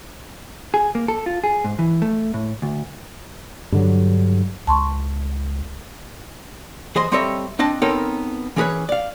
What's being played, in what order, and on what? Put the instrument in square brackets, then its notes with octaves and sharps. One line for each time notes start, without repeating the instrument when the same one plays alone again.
[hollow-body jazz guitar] G#4
A#3
A4
F4
G#4
G#2
E3
A3
A2
D2
[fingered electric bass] G2 D3 F#3
[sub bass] C#2 [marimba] A5 C6 C#6
[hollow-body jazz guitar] E3 G#4 C5 D#5 C6
G3 C4 A4 C#5 D#5 E5
C4 D4 D#5 A5
B3 C4 D#4 A4 A#4 C#5
E3 C#4 G#4 A#4 B4 C#5
D5 F5